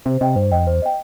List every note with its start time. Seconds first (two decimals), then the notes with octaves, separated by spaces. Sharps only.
0.05 C3 C5
0.21 C3 D#5 G5
0.36 G2 C5
0.52 F2 D#5 G5
0.67 E2 C5
0.82 D#5 G5